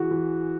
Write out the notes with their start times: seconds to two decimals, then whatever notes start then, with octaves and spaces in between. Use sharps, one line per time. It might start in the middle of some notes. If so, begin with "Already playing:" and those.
Already playing: E3 F#4 G#4
0.11 E3